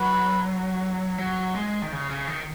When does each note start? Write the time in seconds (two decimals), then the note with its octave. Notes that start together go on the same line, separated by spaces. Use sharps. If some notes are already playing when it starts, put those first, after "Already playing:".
Already playing: F#3 B4
1.19 F#3
1.55 G#3
1.82 D#3
1.92 C#3
2.10 C#3
2.28 D#3